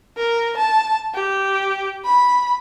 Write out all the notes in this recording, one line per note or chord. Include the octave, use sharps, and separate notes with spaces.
A#4
A5
G4
B5